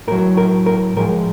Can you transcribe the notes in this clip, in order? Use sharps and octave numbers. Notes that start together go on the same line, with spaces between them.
A2 F#3 A#4
A#4
A#4
A2 F3 G#3 A#4